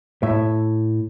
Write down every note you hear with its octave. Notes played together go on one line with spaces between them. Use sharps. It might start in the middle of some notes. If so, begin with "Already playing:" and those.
A2 E5